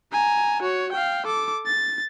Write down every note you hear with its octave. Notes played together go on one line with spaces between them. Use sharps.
G#5 A#5
F#4 C#5
F5 G5
A4 D6
A6